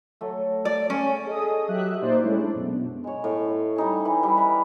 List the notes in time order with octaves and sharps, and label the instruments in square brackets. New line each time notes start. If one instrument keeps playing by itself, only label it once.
[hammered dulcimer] F#3 A3
[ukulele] D5
[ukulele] C#4 [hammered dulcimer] G#4 C#5 G#5
[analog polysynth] G#4 A4 D#5 D#6
F#3 G4 E5 F#6
A#2 D#4 C5 D5
G#3 A3 C#4 E4
D4
F#2 B2
[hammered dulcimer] G#3 C#5
A2
G3 D#4 G#5
E3
G3
B4